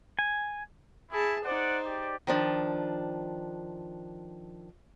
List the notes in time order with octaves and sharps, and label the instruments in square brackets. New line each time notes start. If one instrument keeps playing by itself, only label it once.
[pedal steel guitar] G#5
[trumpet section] E4 [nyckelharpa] G#4 A5
[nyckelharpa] D#4 C5 [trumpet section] D5 F#5
[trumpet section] G4 D5
[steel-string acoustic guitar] D#3 F3 D4